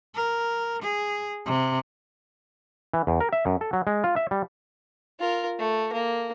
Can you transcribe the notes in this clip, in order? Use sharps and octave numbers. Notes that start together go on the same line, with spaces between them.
A#4
G#4
C3
E3
E2
A#4
E5
F#2
A4
F#3
G#3
F4
E5
G3
F4 A#4
A3
A#3